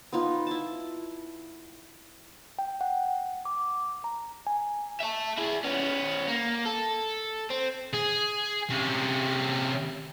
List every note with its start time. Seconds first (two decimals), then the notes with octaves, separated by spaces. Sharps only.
0.12 B3 D#4 F4
0.47 E4 A5
2.59 G5
2.81 F#5
3.45 D6
4.04 A#5
4.47 G#5
5.01 E5 A5
5.38 E4 G#4
5.65 B3 C#4
6.28 A#3
6.65 A4
7.50 C4
7.94 G#4
8.70 C3 C#4